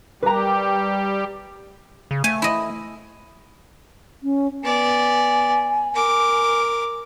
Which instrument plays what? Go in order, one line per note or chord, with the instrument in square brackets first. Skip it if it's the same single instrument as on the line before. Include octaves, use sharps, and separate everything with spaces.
[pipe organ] G3 G4 [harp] B4 A#5
[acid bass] C#3
[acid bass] A3 [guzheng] G#5
[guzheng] E4 D#5
[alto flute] C#4
[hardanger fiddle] B3 D5 [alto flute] G#5
[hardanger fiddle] A#4 D6